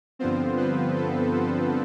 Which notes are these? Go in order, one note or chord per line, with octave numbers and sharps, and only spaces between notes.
G2 D3 F3 B3 C4 F4 C5
B3 B4
A4
A4